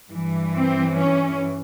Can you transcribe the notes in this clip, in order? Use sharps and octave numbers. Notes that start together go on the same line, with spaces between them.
G2 E3
C4
C#4